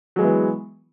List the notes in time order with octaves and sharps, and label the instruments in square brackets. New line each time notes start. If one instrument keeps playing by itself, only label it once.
[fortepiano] F#3
G#3
B3
E3